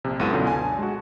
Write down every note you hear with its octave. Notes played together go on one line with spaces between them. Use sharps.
A#1 C3
C#2 F#2 B3 E4 A4 D#7
F#2 B2 D3
G#5 A5
G#3 F#4